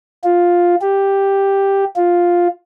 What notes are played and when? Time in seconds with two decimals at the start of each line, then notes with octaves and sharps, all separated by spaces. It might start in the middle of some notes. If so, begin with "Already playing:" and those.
0.24 F4
0.81 G4
1.96 F4